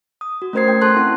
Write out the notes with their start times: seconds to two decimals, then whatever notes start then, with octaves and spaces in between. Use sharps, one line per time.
0.21 D#6
0.42 F#4
0.53 A3 C#4 A#4 C5 G#6 C7
0.68 G5
0.81 A4 A5 C6 F#6
0.96 C4 E4 F#5 C6